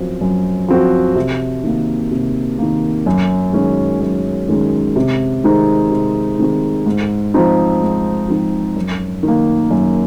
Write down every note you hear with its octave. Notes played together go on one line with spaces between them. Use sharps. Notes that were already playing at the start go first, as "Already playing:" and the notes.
Already playing: F#2 F3 C4 F#4
F#2
F3 C4 F#4
C3
D#3 A#3
C3
D#3 A#3
F#2
D#3 G#3 C#4
F#2
D#3 G#3 C#4
C3
D#3 G#3 C4 D#4
C3
D#3 G#3 C4 D#4
G#2
F3 C4 D#4
G#2
F3 C4 D#4
F#2
D#3
A#3
F#2